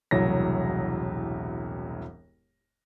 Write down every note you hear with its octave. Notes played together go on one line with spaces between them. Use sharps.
E1 C2 A2 F#3 A#6